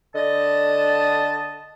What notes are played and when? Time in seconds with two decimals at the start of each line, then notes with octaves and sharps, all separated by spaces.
0.15 D3 D#5 A5